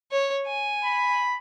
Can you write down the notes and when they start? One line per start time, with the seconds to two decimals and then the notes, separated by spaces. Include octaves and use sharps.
0.11 C#5
0.47 G#5
0.85 B5